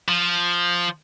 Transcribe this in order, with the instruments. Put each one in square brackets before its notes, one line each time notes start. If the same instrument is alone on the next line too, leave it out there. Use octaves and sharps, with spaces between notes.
[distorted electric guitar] F3